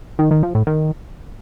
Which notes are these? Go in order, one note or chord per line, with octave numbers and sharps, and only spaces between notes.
D#3
D#3
F3
A2
D#3